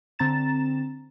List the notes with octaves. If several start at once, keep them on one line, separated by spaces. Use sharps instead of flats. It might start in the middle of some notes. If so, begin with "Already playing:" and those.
D3 C4 A#5 A6 E7